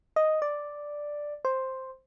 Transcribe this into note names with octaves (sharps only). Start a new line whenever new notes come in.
D#5
D5
C5